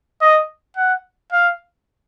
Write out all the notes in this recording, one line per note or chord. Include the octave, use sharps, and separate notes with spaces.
D#5
F#5
F5